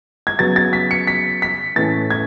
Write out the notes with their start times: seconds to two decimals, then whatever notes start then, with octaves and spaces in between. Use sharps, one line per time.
0.27 G#6
0.39 C#3 F#3 B3 A6
0.56 A6
0.73 B6
0.91 C#7
1.07 B6
1.42 B6
1.76 A2 E3 A3 C#4 A6
2.10 G#6